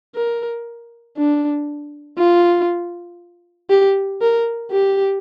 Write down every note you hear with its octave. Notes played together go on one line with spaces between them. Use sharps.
A#4
D4
F4
G4
A#4
G4